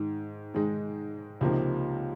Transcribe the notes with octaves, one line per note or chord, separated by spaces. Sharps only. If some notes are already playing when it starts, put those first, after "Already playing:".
Already playing: G#2 D#3 G#3 D#4
G#2 D#3 G#3 D#4
C#2 C3 F3 A#3 D#4